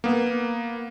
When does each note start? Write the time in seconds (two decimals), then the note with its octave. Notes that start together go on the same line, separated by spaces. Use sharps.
0.04 A#3 B3